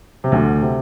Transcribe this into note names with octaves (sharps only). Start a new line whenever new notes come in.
C3
D2 D3
C3